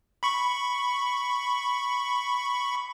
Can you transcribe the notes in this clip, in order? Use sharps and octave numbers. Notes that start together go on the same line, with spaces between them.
B5 C#6